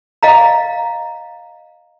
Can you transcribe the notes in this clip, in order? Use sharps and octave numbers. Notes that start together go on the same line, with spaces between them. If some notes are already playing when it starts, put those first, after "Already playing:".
D#5 F5 A#5